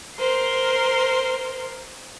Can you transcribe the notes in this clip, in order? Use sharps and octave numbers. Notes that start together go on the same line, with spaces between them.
A#4 C5 C6